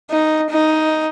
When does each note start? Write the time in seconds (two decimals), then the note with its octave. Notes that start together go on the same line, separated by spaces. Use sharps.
0.11 D#4
0.50 D#4